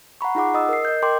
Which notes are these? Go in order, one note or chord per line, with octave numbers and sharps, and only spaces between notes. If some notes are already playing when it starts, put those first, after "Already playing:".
F#5 A#5 B5 C#6
D#4 F4 G#4 F#5 D6
D#5 D#6 E6
A#4 C7
D#5 G6
A#4 G5 C6 D6 G6